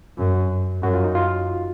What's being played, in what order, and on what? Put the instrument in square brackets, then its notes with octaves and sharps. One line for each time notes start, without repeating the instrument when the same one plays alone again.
[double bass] F#2
[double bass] F#2 [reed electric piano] F#4
[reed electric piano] F4
D#4
F4